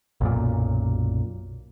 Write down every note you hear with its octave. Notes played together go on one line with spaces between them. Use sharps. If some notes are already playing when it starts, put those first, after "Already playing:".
B1 F#2 A#2